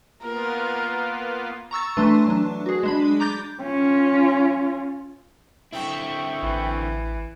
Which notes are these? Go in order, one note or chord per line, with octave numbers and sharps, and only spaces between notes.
A#3 B3 F4 A#4
A#5 C#6 E6 A6
E3 A3 D4 B4 C6
F#3 D4
F#4 G#4
G#3 D4 B5
A#5 D6 G6 A6
C#4 F4
D3 C4 E4 E5 G5 C#6
A1 E3